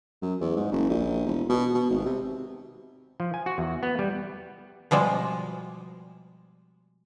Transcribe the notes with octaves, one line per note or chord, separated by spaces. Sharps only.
F#2
E2
G#2
F#1
A#1
E1
B2
B2
G#1
C3
F3
G#5
F#4
E2
B3
G3
B2 F3 G3 G#3